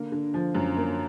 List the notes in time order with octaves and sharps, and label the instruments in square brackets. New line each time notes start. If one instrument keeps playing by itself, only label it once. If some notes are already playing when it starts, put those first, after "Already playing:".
Already playing: [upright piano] D3 A#3
D3
F3
F#2
A#3